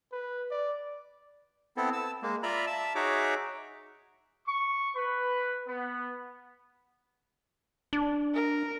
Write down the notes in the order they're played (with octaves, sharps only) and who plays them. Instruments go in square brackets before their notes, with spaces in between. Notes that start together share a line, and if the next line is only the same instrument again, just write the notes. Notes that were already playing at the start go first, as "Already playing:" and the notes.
[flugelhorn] B4
D5
[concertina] B3 C4 E4 A4
A5 E6
G#3 A#3
F4 D5 E5 A#5 B5
E5 A5 E6
D#4 F#4 G#4 C#5 E5 D6
[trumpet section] C#6
B4
B3
[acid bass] D4
[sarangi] A#4